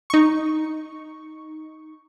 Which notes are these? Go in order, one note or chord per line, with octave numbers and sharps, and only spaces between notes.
D#4 C#6